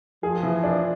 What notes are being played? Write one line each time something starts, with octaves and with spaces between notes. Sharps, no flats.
F3 G#4
E3
D4